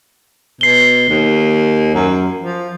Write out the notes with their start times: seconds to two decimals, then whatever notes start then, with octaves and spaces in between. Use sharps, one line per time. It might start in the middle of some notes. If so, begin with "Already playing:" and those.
0.61 B2 C7 G7
1.09 D#2
1.95 F#2
2.41 F3